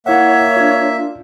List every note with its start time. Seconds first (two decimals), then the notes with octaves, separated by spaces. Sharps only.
0.06 A#3 E4 C#5 E5 F#5
0.57 D4 F4